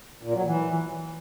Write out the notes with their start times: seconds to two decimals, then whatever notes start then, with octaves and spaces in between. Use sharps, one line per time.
0.23 A#2
0.34 F#3
0.45 E3